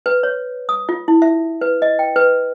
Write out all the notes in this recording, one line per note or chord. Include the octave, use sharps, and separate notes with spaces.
B4
C#5
D#6
F4
E4
E5
B4
D#5
G5
B4